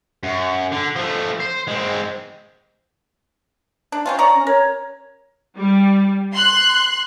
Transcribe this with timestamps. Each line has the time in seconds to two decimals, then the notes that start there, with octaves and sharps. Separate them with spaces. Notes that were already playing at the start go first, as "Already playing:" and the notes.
0.23 F#2
0.72 D3
0.96 F3 A3
1.40 C5
1.67 G#3 C4
3.92 D4
4.06 C4 C#4 F4
4.19 C#5 D5 A#5
4.35 C#4
4.47 A#4 C#5
5.57 G3
6.33 C6 F#6